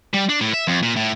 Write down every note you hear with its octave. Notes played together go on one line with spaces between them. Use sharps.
G3
D4
A2
E5
F2
A#2
A2